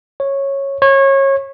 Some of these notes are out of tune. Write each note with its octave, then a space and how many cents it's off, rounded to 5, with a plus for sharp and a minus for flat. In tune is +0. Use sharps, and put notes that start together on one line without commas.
C#5 -10
C#5 -25